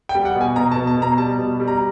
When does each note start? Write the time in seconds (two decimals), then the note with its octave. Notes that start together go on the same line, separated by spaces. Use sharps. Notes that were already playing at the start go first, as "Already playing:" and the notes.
0.09 G5
0.15 G3
0.25 F#5
0.35 B2
0.41 G#5
0.56 B2 A#5
0.72 A5
0.76 B2
0.87 A5
0.97 B2 A#5
1.18 G3 A5
1.39 B2
1.60 G3
1.68 A#5